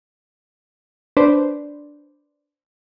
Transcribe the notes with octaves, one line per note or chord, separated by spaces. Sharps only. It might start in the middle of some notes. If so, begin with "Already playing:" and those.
D4 B4 C5 D5